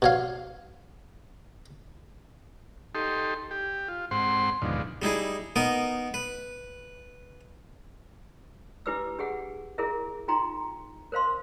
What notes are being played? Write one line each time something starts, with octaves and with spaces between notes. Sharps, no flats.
B2 C#5 F5
D#4 G4 A4 C6
G4
F4
G#2 C4 C5 F#5 C6
D#2 G#2 B2 D3 F3
G3 D#4 E4 G#4
B3 D#4 A#4 D#5
B4
D4 E4 G4 B4 D6 E6
D4 G4 G#4 F#5
E4 G#4 A#4 E5
D#4 F4 G5 A#5 C6
A#4 C5 F5 C6